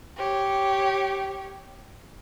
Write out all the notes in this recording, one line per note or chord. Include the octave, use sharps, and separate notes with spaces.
G4 C#5